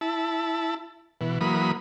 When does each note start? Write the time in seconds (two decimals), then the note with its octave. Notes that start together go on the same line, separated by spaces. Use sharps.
0.01 E4 A5
1.21 B2 E3
1.41 E3 F#3 A#3 B5 D#6